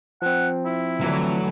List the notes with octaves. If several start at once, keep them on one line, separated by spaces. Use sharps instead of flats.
F3 C4 F#5
E4
D3 E3 F#3 A3